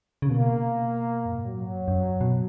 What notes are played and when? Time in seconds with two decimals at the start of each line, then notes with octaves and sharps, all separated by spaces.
0.22 C#3
0.29 B2 A#3
1.26 F#2
1.34 G#2
1.44 A#2 F#3
1.58 G#2
1.73 F#2
1.88 F#2
2.21 B2